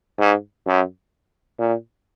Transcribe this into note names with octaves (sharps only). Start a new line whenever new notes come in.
G#2
F#2
A#2